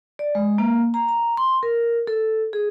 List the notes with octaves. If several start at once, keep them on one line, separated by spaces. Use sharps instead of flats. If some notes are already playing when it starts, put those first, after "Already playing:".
D5
G#3
A#3
A#5
A#5
C6
A#4
A4
G#4